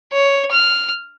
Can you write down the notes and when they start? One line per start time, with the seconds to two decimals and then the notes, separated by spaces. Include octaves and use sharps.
0.12 C#5
0.51 F6